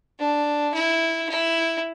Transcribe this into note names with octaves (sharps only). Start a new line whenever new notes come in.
D4
E4
E4